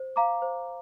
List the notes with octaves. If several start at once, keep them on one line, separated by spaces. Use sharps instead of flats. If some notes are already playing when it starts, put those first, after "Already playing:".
Already playing: C5
F5 A#5 D6
C5